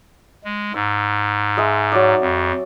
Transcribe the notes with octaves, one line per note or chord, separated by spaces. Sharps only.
G#3
G#2 E6
G#3 D#5 E5
F#3 D5
F2